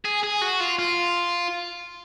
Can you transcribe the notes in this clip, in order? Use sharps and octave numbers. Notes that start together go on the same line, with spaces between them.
G#4
G#4
F#4
F4
F4